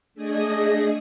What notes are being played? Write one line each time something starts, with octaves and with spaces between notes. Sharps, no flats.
A3 D4 G#4 D#5 G#5 A#6